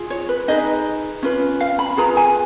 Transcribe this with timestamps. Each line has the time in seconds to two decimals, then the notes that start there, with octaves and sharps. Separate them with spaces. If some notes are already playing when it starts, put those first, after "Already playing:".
Already playing: F4 G#4
0.10 C#5
0.29 B4
0.48 D#4 G#4 B4 D#5
1.23 C#4 F4 B4
1.60 F5
1.79 B5
1.97 F4 G#4 B4 A#5
2.17 G#5